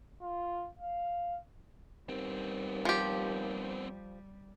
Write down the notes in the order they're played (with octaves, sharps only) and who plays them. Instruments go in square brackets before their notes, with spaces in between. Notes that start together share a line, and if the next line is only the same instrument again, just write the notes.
[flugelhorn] F4
F5
[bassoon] D#2 [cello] G3 [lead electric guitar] B3 C4
[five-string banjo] F3 G4